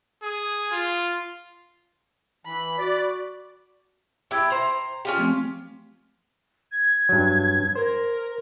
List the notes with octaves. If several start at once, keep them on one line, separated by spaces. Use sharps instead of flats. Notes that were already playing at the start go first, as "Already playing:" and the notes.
G#4
F4
E3 B5
F#4 D5
E4 G4 G5 E6 G#6
C5 A#5
C#4 F4 G4
F3 A3 C4
G#6
G2 F#3
A#4 C5